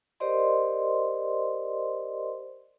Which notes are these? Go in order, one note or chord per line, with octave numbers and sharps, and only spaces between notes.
G4 A#4 C5 D5 D#5 C6